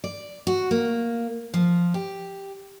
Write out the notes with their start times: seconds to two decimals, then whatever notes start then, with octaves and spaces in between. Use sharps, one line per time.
0.04 D5
0.47 F#4
0.71 A#3
1.54 F3
1.94 G4